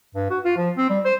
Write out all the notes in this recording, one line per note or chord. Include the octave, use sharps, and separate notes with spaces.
G2
F#4
F4
F3
C4
G3
C5